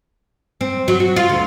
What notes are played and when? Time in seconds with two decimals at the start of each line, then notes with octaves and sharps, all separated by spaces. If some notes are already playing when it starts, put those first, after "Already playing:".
0.61 C4
0.88 F#3
1.00 F#4
1.16 F4
1.29 D2